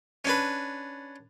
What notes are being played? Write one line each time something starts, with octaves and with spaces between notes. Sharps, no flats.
C#4 D4 B4